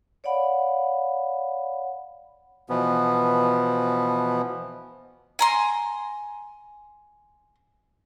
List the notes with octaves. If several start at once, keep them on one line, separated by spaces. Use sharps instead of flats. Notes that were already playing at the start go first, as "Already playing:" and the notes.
C#5 D5 F5 F#5 B5
B2 E3 F3 B3
G#5 A#5 C6